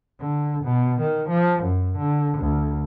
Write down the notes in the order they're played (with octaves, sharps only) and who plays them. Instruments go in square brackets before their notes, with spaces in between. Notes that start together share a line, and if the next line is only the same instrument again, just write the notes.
[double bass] D3
B2
D#3
F3
F#2
D3
D2